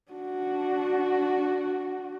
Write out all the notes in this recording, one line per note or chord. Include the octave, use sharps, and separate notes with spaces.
D4 F#4